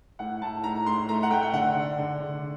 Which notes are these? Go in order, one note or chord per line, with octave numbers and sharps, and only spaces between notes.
A2 F#5
A2 A5
A2 A#5
A2 C6
A3 A#5
F#5
A3 G5
G5
D3 F#5
D4
D3
D3